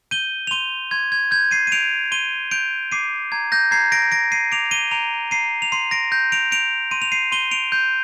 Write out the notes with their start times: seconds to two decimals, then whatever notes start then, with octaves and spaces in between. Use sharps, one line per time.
0.11 G6 D#7 G7
0.47 F7
0.51 C6 D#7 G7
0.91 C6 G#6
1.12 G#6
1.31 G6 G#6
1.51 C7 D#7
1.67 D#7
1.72 G6 D7 F7
2.12 C6 D#7 G7
2.51 G6 D7 F7
2.92 D6 C7 D#7
3.32 A#5 G#6
3.52 G6 A#6
3.71 A#5 G#6 C7
3.92 A#6 D7
4.11 G6 A#6 D7
4.32 C7 D#7
4.52 D6 D7 F7
4.71 D#7 G7
4.91 A#5 D7 F7
5.31 A#5 C7 D#7
5.62 F7
5.72 C6 C7 D#7
5.91 A#6 D7
6.12 G6 A#6
6.32 D7 F7
6.51 G6 D7 F7
6.91 C6 D#7
7.02 F7
7.12 C7 D#7
7.32 C6 D#7 G7
7.51 D7 F7
7.72 G6